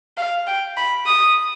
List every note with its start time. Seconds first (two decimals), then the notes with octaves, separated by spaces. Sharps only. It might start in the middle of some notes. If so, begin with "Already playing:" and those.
0.17 F5
0.47 G5
0.77 B5
1.07 D#6